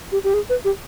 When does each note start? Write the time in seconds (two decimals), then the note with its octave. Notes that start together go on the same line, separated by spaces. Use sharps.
0.12 G4
0.24 G4
0.34 G#4
0.50 B4
0.65 G4